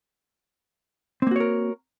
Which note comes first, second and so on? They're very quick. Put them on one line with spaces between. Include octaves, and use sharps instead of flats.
C4 A#3 F#4 C#5 A#4